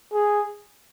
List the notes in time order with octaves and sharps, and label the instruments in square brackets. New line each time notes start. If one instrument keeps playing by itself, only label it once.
[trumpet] G#4